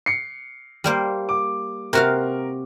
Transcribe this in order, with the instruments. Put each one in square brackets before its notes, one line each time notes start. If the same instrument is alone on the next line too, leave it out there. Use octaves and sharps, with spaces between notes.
[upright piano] C7 C#7
[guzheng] G3 A#3 C5
[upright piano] D6
[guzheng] C3 F#4 F5 [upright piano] A#4